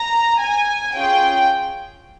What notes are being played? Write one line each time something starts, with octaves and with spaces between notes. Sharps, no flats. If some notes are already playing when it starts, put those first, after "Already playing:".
Already playing: A#5
G#5
C#4 F4 G#4 G5